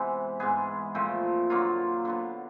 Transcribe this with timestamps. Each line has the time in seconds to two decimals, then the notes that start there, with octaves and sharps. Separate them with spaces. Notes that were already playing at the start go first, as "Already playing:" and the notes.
Already playing: C3 E3 G#3 B3
0.40 G#2 E3 G#3 B3 G#4
0.95 A#2 F3 A3 C4
1.50 D3 F#3 A#3 F4
2.05 D3 F#3 B3